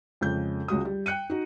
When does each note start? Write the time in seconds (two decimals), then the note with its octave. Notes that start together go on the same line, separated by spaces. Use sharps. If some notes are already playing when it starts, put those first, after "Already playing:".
0.21 F2 C#3 G#3 G6
0.68 C#2 G#3 F#4 D#6
0.85 G3
1.06 G5 F#6 C#7 D#7
1.30 D#4 F#4